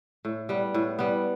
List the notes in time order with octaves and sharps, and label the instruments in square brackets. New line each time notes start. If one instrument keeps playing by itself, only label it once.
[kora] A2
G3 B3
A2
G3 B3